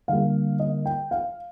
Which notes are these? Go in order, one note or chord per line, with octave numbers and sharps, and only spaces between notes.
D3 G3 A#3 F5
D#5
G5
F5